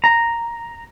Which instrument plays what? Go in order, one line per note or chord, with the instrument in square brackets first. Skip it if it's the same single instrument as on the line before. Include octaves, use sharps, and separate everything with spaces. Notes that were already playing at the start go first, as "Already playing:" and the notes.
[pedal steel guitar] A#5